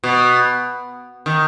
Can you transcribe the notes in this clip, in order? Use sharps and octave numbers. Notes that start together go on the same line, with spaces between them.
B2
D#3